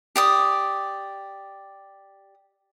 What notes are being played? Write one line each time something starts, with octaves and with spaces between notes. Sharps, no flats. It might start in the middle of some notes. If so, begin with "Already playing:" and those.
G4 D5 D#6